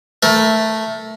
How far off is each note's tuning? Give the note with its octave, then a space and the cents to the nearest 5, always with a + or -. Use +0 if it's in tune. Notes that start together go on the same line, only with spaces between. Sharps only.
A3 +0 A#4 +25